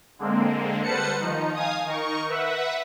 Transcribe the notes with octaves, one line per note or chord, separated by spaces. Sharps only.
D3 G#3 A#3 C4
G3 B4 C5 F#5 A5 C#7
D#3 F3 D#4
F5 G#5 D#6
D#3 D#4 A#4 C#6
B4 E5 F#5